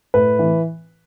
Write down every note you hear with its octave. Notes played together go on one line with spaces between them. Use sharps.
A2 B4
E3